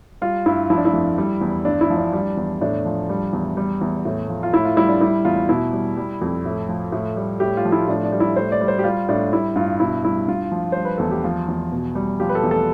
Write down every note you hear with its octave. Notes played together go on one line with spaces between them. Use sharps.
G3 F4
G2 E4
F3 E4
D4
E4
F2
G3
E2
G2 D4
E4
F3
D4
G3
E2
A2 D4
F3
G3
E2
G3
E2
A2
F3
F4
A2 E4
F4
G3 E4
D4
G3 E4
E2 F4
B2 E4
G3
G3
F2
A2
F3
A2
G3
A2 G4
F4
F3
E4
A2 D4
D4
G3
E4
A2 C5
D5
G3
C5
G4
G3 F4
A2 D4
G3 E4
G2 F4
B2 E4
G3 E4
G2 F4
F3
G3 C5
B4
E2 A4
G4
F3 F4
E2
B2
G3
F3 G4
B4
A4
E2
A4